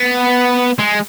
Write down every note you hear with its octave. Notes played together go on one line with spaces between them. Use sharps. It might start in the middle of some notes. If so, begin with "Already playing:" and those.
Already playing: B3
G#3